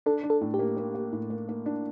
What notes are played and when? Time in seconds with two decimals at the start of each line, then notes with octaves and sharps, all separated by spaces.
0.06 D4 A4
0.23 D4
0.30 A4
0.41 A2
0.54 G4
0.59 A#3
0.77 A#3
0.95 A#3
1.12 A2
1.30 A#3
1.49 A#3
1.66 D4